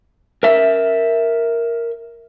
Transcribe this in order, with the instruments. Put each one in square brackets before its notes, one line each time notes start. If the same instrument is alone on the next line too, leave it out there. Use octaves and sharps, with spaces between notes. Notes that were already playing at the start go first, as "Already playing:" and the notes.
[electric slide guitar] A#4 E5